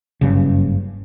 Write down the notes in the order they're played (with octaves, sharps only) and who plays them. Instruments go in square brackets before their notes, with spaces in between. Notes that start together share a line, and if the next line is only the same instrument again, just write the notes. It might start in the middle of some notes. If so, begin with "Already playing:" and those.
[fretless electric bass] F#1 G2 C#3